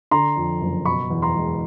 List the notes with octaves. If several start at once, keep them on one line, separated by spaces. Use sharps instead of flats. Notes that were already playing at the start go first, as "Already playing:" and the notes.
D3 A#5 C6
F2
F#1
B2 B5 C#6
E2
A#5 C6
G#3